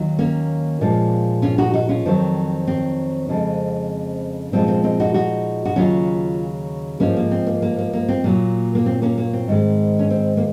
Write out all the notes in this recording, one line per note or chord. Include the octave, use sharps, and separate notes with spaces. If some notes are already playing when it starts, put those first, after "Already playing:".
Already playing: D#2 D#3 F#3
A#3 C#4
A#2 F3 G#3
C#4 F4
D#4 F#4
D#4 F#4
C#4 F4
F2 D#3 F#3 C4
C4
F2 C#3 G#3
A#2 F3 G#3 C4
C4
C4 D#4
D#4 F#4
D#4 F#4
F#4
D#2 C#3 F#3 C#4 F4
G#2 F3 G#3 A#3 C#4
A#3
C4
A#3
A#3
A#3
A#3
C4
A#2 F#3 A#3
A#3
C4
A#3 C#4
A#3
C4
G#2 D#3 G#3
C#4
C4
A#3